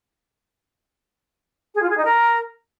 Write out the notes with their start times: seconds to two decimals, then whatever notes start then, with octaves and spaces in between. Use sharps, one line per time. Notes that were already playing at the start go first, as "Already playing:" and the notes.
1.74 G#4
1.82 F4
1.89 G#4
1.97 D#4
2.04 A#4